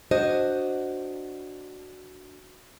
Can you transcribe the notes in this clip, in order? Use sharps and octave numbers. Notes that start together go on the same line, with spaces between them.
D4 F#4 C5 D#5